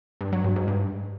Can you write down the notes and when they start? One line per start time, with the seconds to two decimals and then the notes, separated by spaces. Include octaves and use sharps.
0.21 G2
0.32 F#3
0.44 G2
0.56 G#2
0.68 G2